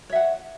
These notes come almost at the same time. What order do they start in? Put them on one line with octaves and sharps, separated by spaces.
C#5 E5 F#5